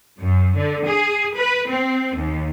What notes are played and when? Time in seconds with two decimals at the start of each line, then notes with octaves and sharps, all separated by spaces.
0.20 F#2
0.56 D3
0.85 G#4
1.36 B4
1.68 C4
2.14 D#2